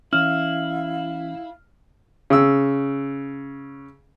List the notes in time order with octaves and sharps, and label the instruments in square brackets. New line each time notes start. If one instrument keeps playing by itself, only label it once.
[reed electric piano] E3 C#4 [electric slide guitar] E4 [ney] F5 [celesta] F6
[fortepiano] C#3 E6